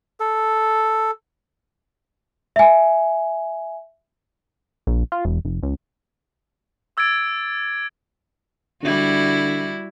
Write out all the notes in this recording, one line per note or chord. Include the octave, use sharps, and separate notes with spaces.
A4
E5 G#5
A#1
F4
E1
F1
C#2
D6 E6 G#6 A6 D7
D3 G3 E4 F#4